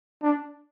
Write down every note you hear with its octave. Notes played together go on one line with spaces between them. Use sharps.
D4